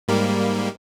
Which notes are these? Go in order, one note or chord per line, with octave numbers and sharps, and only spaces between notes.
G#2 G3 A#3